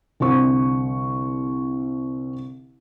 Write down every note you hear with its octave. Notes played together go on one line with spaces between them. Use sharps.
C2 D3 C5 C#6